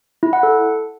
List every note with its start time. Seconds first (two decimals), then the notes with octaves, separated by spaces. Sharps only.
0.23 E4
0.33 F#5
0.43 A4